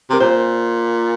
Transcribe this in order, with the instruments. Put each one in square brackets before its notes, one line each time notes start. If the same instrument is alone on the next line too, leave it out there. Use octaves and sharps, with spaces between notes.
[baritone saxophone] C3 [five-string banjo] A#4
[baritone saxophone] A#2 [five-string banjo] C5